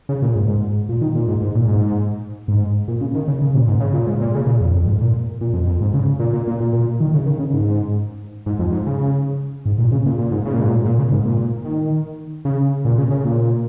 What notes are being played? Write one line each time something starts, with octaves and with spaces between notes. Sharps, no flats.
C#3
A#2
G#2
G#2
A#2
D#3
A#2
G#2
G#2
A#2
G#2
G#2
A#2
C#3
D#3
C#3
C#3
A#2
G#2
C#3
A#2
G#2
A#2
C#3
A#2
F2
F2
G#2
A#2
A#2
F2
F2
G#2
C#3
A#2
A#2
A#2
A#2
A#2
D#3
C#3
D#3
C#3
G#2
G#2
F2
G#2
C#3
G#2
A#2
C#3
A#2
A#2
G#2
C#3
A#2
G#2
A#2
A#2
C#3
G#2
A#2
D#3
C#3
A#2
C#3
C#3
A#2